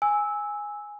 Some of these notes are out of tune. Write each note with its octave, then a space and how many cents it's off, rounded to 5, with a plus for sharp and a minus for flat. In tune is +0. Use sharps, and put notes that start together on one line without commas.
G#5 +0 E6 -15